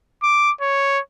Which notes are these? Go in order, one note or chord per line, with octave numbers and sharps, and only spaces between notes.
D6
C#5